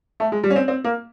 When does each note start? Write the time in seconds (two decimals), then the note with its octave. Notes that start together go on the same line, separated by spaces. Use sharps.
0.20 A3
0.32 G#3
0.43 G3
0.50 C#4
0.56 C4
0.68 C4
0.84 A#3